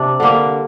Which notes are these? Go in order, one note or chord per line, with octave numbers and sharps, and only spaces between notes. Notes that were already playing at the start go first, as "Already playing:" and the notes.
Already playing: C3 D4
D3 G3 A#3